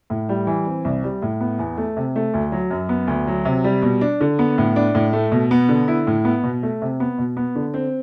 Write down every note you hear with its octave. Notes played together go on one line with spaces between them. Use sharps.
A2
G3
E3
C4
C2
G3
A2
B3
E2
A3
C3
A3
D2
F#3
F#2
B3
D2
F#3
C3
G3
B2
D4
D3
B3
A2
D4
A2
A3
B2
B3
D3
E4
A2
B3
B2
A3
C3
B3
B2
B3
D3
C4